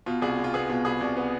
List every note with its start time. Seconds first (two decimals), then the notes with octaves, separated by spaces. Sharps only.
0.06 B2 F4
0.22 C2 G#4
0.38 C2
0.44 F4
0.54 B3 G#4
0.69 B2 F4
0.85 C2 G#4
1.01 C2
1.17 B3